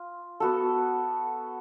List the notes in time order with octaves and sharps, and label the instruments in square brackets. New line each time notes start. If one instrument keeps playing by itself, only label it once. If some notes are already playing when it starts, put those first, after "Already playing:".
Already playing: [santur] F4
B3 F#4 A4